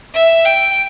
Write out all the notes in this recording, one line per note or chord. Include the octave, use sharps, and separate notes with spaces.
E5
G5